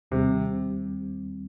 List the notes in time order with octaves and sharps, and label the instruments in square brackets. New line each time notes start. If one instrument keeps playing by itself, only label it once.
[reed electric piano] D#2 D#3 G3 C4 [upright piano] C3